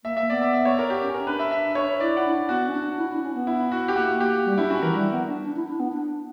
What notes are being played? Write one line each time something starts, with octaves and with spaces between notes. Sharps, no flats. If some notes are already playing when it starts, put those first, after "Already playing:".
A#3 E5
E5
B3 D5
E5
E5
C#5
A#4
G4
C#4
A#4
D4 B4
E5
E5
C#5
E4 D5
F#5
D4
B3 F#4
C#4
D4
E4
D4
C#4
B3
E4
F#4
G4
A#3 F#4
A#3 G4
G3
D4 E4
C#4 F#4
E3 A#4
G3
B3
D4
D4
E4
D4
B3
D4